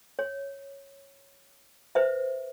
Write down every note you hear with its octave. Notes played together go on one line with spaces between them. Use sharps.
C#5
B4 C5 E5